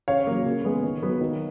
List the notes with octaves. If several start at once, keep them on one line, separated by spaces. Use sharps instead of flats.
C#3 C#5 F5
F#3 A#3
C#3
G#3 B3
D#3
F#3 B3
D#3